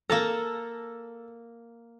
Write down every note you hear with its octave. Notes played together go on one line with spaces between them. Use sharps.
A#3 A4 A5 A#5